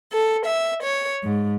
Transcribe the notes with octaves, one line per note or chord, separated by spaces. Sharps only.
A4
E5
C#5
G#2